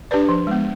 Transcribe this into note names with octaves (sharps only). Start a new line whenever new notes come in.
D4 G4 B4 D5
F3
G#3 B3